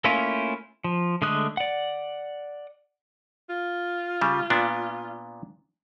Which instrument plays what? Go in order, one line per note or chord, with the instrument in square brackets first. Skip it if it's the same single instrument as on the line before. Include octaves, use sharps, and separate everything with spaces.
[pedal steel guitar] A3 A#3 C#4 E4 F4
F3
D3 G#3 A3 D#6 F#6
D5 F#5
[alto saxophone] F4
[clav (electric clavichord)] C#3 G3
A#2 B3 D4